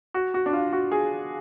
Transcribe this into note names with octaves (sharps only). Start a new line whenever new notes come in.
F#4
F#4
D4
F4
F#4
G#4